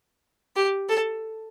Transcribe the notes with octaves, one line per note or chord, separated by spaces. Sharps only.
G4
A4